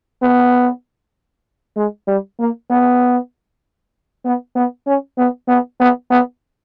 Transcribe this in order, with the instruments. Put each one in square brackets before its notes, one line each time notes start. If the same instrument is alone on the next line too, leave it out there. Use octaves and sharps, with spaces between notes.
[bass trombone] B3
G#3
G3
A#3
B3
B3
B3
C#4
B3
B3
B3
B3